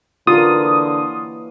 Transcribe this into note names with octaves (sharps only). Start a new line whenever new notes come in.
D3 E3 F#3 A#3 F4 D#6